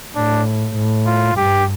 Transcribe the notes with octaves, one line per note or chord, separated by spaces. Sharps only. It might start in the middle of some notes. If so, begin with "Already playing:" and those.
A2 D4
A2
F4
G2 G4